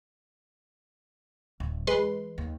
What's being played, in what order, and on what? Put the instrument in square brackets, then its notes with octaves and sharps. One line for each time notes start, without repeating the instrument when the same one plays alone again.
[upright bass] D1
[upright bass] E3 [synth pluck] G#3 B4 C6
[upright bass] D#2